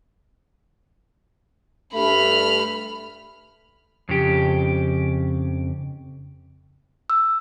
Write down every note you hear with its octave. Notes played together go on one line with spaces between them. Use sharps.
G2 A3 B5 F6
F2 C#3 G4
E6